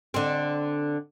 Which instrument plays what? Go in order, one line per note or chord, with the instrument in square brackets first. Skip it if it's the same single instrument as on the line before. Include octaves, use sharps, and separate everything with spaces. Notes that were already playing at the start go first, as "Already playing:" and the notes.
[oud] D3 C4